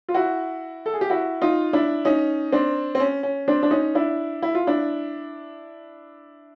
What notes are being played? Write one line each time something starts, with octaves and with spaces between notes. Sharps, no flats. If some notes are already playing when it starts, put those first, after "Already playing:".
F4
E4 F#4
A4
G#4
G4
E4 F#4
D#4 F4
D4 E4
C#4 D#4
C4 D4
C4
C#4
C#4
C4 D4
D4
C#4 D#4
D4 E4
E4
F4
D4 E4